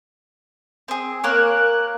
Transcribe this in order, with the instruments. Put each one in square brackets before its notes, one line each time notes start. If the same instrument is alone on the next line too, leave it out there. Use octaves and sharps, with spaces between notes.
[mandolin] C4 G#4
[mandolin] A#3 A#4 C#5 [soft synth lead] F#6